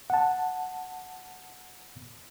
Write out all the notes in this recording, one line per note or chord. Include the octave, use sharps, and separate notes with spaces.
F#5 A5